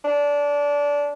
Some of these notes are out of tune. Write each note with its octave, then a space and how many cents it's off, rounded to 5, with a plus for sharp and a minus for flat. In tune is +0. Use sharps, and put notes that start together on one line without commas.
D4 -20